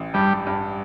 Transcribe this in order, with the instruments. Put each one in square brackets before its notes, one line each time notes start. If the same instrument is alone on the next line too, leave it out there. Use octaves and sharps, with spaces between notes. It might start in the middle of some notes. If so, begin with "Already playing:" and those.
Already playing: [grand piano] A1
[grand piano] G2 [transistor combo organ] G3
[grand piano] G2